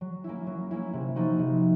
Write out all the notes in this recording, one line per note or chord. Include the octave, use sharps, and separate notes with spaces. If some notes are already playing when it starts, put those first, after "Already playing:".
F#3
A#3 C#4 E4
F#3
A#3 C#4 E4
C3
F3 A#3 D#4 F#4
C3